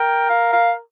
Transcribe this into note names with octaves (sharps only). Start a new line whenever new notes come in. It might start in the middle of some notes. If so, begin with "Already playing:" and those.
Already playing: A#4 G5
F5
F5